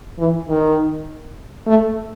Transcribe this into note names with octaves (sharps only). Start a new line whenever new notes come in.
E3
D#3
A3